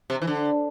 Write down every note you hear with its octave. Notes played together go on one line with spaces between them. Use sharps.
C3
E3
D3